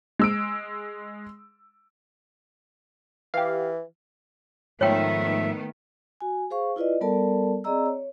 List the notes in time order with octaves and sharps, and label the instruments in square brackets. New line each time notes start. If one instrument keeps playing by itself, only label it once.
[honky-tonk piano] G#3 E6 D7
[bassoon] E3 [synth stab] G4 F5
[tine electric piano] G#2 F3 [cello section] D#3 A3 B3 [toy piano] C#5 G5 [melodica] E5
[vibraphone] F#4 G#5
G#4 C5 F5 C#6
E4 F4 B4 D5 D#5
G3 B3 A4 A#4 D5 A5
C4 G#4 D5 D#5 A#5 E6
C#5